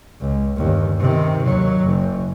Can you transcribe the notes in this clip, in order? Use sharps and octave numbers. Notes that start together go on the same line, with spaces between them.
C#2
G1 D#2
C3 D#3
D#2 F#3
F#1